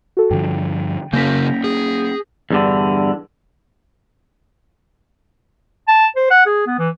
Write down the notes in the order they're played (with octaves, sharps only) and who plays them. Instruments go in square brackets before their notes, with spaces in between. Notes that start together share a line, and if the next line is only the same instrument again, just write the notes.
[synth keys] F#4 A4
[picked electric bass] G2 D3 F3 [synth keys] G5
[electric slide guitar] C#3 F#3 A#4 [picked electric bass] A#3 C#4 [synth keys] G6 A#6 B6
[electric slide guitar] G#4
[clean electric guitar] E2 G2 D3
[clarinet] A5
C5
F#5
G#4
B3
E3